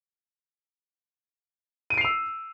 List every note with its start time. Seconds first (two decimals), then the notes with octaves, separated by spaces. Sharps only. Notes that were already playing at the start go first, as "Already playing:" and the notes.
1.90 D#7
1.94 D7
1.97 C7
2.01 F7
2.05 E6